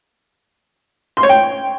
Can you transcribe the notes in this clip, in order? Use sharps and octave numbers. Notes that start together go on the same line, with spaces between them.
C6
C#5
G5